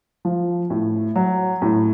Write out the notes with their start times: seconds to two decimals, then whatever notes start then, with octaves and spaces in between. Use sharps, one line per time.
0.25 F3
0.70 A2
1.15 F#3
1.62 A2